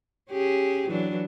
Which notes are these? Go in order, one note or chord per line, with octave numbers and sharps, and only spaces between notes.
C#4 G4 G#4
E3 F#3 D4